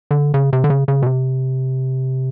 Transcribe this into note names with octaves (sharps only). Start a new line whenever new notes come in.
D3
C#3
C3
D3
C#3
C#3
B2
C3